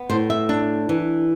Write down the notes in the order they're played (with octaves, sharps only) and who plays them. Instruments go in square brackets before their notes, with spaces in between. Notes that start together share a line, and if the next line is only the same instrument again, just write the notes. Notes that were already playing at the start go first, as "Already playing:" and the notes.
Already playing: [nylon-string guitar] B3
A2 C5
E5
D4
E3